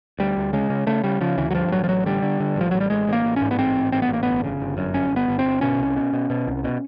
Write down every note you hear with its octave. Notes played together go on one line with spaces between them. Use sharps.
D2 G3
D2
C#3 G#3
C#3
C#3 A3
C#3 G3
C#3 F3
D2 E3
F#3
G2 F3
A1 F#3
F3
A1 F#3
D3 G3
D3
D3
A1 F3
A1 F#3
G3
A1 G#3
A1
A#3
A1
C#4
G#2
B3
A1 C4
G#2
A1 C4
B3
A1 A#3
G1 B3
C#3
G1
F#2
G1 C#4
G1
B3
G1
C4
G1
B2 C#4
C2
B2
B2
B2
C2
B2